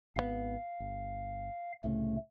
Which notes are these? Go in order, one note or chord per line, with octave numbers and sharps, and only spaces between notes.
G#1 D#3 B3 F5
G1
C2 A2 C#3 A3